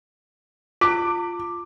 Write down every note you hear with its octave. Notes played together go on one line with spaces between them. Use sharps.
F4 D6